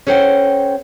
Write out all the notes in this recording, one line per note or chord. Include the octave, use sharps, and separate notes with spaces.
C#4 A4 C5 F#5 G5